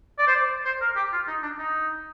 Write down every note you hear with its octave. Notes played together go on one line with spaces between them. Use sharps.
D5
C5
D5
C5
A#4
G4
F4
D#4
D4
D#4